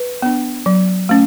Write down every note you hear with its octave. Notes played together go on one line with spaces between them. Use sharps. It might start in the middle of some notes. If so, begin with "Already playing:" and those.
Already playing: B4
B3 D4
F#3
A3 C#4